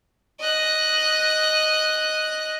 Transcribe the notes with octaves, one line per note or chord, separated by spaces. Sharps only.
D#5 F#6